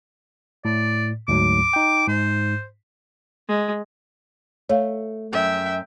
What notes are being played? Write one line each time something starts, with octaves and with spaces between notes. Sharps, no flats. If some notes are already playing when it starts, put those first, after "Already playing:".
A2 D5
D2 G#2 F#3 D6
D#4 G5
G#2 C5
G#3
A3 C#5 F5
F#2 E5 G5